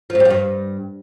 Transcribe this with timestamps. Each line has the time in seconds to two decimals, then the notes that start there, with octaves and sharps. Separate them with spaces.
0.10 F3
0.15 A2
0.20 G3
0.25 F3
0.30 G2